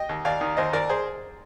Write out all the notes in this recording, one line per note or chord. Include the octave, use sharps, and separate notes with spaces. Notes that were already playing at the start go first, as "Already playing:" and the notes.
Already playing: D#5 G5
D#2
D#2 D5 F5
D#3
D#2 C5 D#5
D#2 A#4 D5
G#4 C5